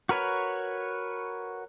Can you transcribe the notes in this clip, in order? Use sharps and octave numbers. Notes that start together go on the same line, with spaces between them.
F#4 A#4 B4 C#5